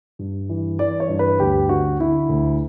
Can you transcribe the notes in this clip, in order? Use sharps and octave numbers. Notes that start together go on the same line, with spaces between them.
G2
E3
E3 D5
C#5
G2
B4
D2 G4
D3 F#4
D3 E4
D2